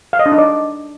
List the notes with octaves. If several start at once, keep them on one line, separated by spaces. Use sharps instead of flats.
F5
D#5
D4
D#4
D5